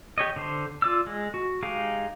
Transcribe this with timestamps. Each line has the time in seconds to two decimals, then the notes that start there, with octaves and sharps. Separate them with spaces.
0.18 G4 C#5 D#5
0.36 D3 C5
0.82 F4 D5 E6
1.07 G#3
1.34 F#4
1.63 G#3 D#4 G4 F5